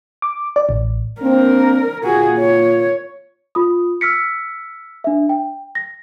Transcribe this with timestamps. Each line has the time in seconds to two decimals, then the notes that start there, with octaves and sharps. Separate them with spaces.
0.22 D6
0.56 D5
0.69 A1
1.21 A#3 C4 D4 A#4
2.04 A#2 F4 F#4 G#4
2.39 C#5
3.55 F4 B5 D#6
4.01 E6 F6 B6 C#7
5.04 D4 E5
5.29 G5
5.75 A#6